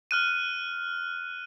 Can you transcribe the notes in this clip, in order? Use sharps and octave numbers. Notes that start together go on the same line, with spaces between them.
F6 F#6 D#7